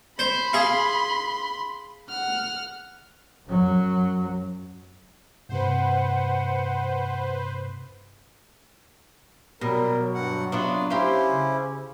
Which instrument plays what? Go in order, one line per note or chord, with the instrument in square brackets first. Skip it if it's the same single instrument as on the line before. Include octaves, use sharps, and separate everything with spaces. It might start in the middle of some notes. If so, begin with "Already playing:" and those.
[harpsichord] C5 [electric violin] B5 C6
[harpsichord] G#4 F5
[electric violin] F#5 F6
[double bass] F#2 F#3
[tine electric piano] G2 C3 [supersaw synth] B4 C5 [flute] F#5
[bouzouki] B2 [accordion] F#3 G3 [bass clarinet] A#4
[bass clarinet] F#3
[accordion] G2 F#5
[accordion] C3 [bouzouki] B3 D4 F4
[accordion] C#4 E4 [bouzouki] G4 C5 F5
[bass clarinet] C#3